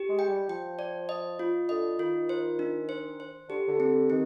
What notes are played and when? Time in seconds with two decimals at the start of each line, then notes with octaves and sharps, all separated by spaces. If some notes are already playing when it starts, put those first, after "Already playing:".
Already playing: G4
0.08 G#3
0.19 G5
0.28 G3
0.48 F3 G5
0.79 D5
1.09 D#5
1.39 F4
1.69 D3 D#5
1.99 D#3 F4
2.29 C5
2.59 D4
2.89 C5
3.20 C5
3.49 D3 G4
3.66 D3
3.80 C4
4.10 D#3 C4